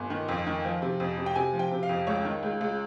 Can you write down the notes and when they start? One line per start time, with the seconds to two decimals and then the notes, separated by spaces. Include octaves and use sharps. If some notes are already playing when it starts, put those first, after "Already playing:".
Already playing: G1 G#5
0.10 D#3
0.28 F2
0.46 D#3
0.64 F3
0.82 C3
1.00 F2
1.17 C3
1.26 G5
1.35 C3 G#5
1.53 F3
1.59 G5
1.71 C3
1.83 F5
1.89 F2
2.07 C#2 C#5
2.25 D#3
2.43 C#2
2.61 C#2